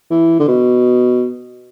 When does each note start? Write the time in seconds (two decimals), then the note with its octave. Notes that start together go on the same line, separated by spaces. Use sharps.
0.11 E3
0.40 D3
0.48 B2